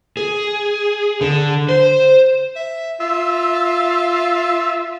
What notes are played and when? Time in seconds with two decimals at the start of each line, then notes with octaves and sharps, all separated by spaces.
0.17 G#4
1.21 D3
1.69 C5
2.56 E5
3.00 F4 E5